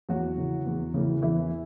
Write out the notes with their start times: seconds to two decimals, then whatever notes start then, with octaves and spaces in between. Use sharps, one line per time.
0.09 E2 F#3 F#4
0.38 C#3 E3
0.66 E2
0.94 C#3 E3
1.22 E2 E3 E4